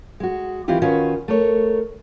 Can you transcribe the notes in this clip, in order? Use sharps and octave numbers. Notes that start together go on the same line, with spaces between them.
G#3 F#4
D#3 E3 C4 E4 F4 G4
D#3 C#4 F4 F#4 B4
A3 A#4 C#5